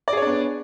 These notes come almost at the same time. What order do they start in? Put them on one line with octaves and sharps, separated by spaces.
D5 G#4 C#5 D4 B3